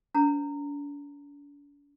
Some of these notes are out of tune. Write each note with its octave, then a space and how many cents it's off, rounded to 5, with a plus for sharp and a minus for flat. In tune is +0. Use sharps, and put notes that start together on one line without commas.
D4 -45 C5 -30 A#5 -20